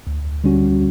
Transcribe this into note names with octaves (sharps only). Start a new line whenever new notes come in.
D2
D3 G3 C#4 F#4